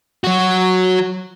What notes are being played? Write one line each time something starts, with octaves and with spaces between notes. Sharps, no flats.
F#3 F#4